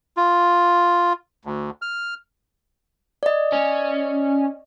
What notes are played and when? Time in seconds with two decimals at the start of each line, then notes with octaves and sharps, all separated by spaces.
0.17 F4
1.45 D2
1.82 F6
3.23 D5 D#5
3.52 C#4